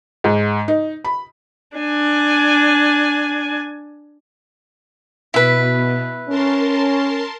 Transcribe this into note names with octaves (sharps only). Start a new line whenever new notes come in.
G#2
D#4
B5
D4 G#5
B2 E4 B4
C#4 A#4 A5 C6